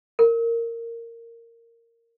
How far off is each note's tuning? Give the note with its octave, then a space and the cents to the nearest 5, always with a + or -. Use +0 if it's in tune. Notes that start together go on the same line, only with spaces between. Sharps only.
A#4 -15